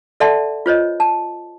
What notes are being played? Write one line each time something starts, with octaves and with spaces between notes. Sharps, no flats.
A4 D5 E5 F#5 A5 C6
F4 C5 C#5 D#5
A5